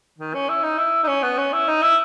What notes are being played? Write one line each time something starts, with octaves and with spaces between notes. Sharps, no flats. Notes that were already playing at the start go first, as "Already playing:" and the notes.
D#3
C#4
E4
D#4
E4
D#4
C#4
B3
C#4
E4
D#4
E4